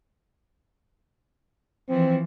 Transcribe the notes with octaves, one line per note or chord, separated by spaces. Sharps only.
E3 F3 C4